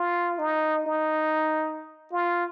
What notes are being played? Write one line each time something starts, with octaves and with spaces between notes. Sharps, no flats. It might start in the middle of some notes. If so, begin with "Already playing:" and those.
Already playing: F4
D#4
D#4
F4